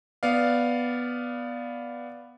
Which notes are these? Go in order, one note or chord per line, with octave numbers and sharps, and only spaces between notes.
B3 D5 F5